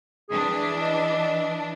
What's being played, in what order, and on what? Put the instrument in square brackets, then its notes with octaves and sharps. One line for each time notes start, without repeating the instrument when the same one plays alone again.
[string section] E3 D4 [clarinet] G#4
[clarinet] D#5